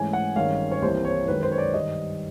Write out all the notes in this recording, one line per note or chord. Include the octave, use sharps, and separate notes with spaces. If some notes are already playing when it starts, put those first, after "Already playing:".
Already playing: G#2 E3 A3 C#4 G#5
F#5
G#1 G2 D#3 G#3 C#4 F5
C#5
C2 C3 E3 G3 A#3 C5
C#5
F#2 D#3 G#3 B4
C5
C#5
D5
G2 D#3 G3 D#5